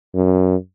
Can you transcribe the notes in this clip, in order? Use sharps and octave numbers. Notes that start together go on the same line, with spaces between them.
F#2